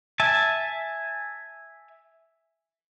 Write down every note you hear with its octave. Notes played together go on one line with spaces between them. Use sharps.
E5 G#5 A5